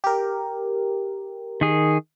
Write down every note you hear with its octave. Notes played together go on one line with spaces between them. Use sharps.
G4 A#4
D#3 G#4